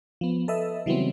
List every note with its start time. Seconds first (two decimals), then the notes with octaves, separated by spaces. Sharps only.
0.21 F3 B3
0.48 A4 B4 D#5 E5
0.86 C#3 E3 F#3 G3 B3 C4